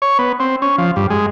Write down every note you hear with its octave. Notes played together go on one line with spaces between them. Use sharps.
C#5
B3
C4
C#4
F3
G2
G#3